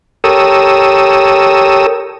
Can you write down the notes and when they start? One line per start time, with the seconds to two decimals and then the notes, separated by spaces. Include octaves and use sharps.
0.24 G4 A4 A#4 C#5 D#6 E6